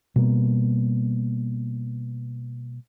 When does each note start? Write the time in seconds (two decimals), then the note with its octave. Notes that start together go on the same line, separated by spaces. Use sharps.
0.16 B2 G3 A#3